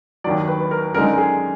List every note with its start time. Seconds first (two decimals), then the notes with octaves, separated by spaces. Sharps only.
0.24 D#2 D#3 F#3 D5
0.48 B4
0.60 B4
0.71 A#4
0.94 F#2 D3 G#3 D#4 A#4
1.18 G#4